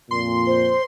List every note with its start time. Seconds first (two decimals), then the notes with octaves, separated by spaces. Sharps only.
0.11 F2 A#2 C6
0.47 C5